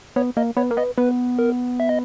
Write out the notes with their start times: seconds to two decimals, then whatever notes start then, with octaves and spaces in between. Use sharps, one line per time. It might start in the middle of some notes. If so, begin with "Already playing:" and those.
0.16 B3 C#5
0.37 A#3 D#5
0.57 B3 C#5
0.71 A#3
0.77 B3 D#5
0.98 B3 B4
1.39 A#4
1.80 E5
1.89 D#5